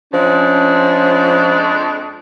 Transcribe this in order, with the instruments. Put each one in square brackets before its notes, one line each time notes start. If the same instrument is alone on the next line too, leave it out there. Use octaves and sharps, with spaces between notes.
[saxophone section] F2 G#3 D4 [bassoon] F3 [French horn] C#4